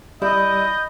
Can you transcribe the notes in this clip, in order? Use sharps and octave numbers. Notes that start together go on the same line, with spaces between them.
G3 E4 D#5 G6